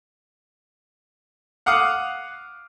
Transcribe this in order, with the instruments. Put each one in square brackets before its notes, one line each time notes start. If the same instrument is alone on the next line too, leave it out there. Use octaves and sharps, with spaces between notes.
[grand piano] F5 F#5 D6 D#6 F6